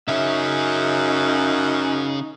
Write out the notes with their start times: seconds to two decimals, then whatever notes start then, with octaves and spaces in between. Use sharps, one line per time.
0.08 F#2 C#3 C#4 D#4 E5